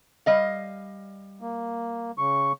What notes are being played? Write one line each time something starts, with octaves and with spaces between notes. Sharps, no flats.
G3 D#5 F5
A#3
C#3 C#6